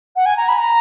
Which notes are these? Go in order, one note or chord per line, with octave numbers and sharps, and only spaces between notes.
F#5
G#5
A#5
B5
A#5